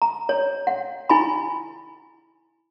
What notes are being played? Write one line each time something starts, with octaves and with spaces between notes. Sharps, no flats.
A#5
C#5
F#5
E4 G#5 B5